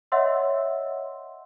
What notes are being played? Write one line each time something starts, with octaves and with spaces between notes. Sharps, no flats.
C#5 D#5 E5 F#5 C6 E6